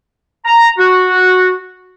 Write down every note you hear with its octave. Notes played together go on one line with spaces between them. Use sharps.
A#5
F#4